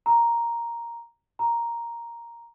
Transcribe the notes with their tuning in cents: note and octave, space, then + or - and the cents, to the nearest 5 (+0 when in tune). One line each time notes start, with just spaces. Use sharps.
A#5 +0
A#5 +0